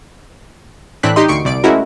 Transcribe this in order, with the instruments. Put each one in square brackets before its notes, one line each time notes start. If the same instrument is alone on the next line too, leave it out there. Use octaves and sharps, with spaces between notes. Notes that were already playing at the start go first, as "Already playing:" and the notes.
[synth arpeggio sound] A2 E3 C4 D4 F#6 B6
D#4 G4 D#5 C6
D2 C#6 C7 D7
C2 D5 D7
G#3 A3 C#4 E4 F#4 A#4